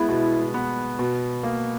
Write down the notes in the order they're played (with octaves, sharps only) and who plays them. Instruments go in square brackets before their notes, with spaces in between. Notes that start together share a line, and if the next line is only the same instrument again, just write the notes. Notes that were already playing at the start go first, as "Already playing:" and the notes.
Already playing: [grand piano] G#3 B3 [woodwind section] E4
[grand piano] B2
B3
B2
A#3